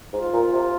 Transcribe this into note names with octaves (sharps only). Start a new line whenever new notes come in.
G#2 F4
A#2
C3